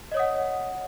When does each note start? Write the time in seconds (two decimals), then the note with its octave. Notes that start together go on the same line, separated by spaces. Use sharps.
0.12 D#5
0.14 C#5
0.17 D#6
0.19 F#5